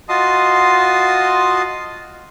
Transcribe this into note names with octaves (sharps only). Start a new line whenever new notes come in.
F4 F#4 D#5 A5 C6 D#6